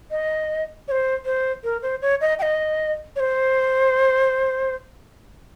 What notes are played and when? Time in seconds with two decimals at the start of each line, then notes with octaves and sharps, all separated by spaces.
0.11 D#5
0.88 C#5
0.91 C5
1.25 C5
1.64 A#4
1.82 C5
2.02 C#5
2.21 D#5
2.39 G5
2.42 D#5
3.16 C#5
3.20 C5